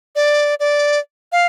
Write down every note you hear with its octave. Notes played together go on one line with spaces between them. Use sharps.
D5
D5
F5